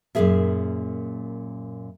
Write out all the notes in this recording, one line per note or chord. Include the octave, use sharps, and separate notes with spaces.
F#2 A#2 C#3 F3 G#4 E5